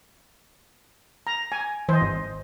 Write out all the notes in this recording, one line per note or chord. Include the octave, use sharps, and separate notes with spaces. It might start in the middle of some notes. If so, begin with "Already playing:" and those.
A#5
G#5
E3 C5 D#5
G#1